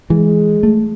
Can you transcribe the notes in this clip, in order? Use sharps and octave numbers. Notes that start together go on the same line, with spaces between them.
E3 G#3
A3